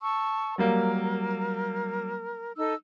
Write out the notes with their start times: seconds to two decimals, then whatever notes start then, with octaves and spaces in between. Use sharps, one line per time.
0.01 A5 C#6 E6
0.58 F#3 G3 A#3 A#4
2.57 D#4 A4 E6